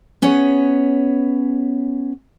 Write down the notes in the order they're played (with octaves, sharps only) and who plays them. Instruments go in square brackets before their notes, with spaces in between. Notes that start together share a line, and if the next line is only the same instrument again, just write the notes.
[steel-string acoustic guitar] B3 C#4 G#4 B4 C#5